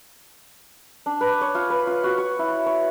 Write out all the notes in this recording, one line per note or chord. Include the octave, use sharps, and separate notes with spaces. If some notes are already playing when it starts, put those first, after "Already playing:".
D4
B4
C#5
F4
B4
F4
F#4
C#5
E4
C#5